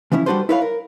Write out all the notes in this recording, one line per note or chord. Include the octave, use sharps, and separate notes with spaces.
E3 F3 C#4 E4
G3 D4 F#4 A4 B4 C5
E4 A4 B4 C#5 D5 F5
A#4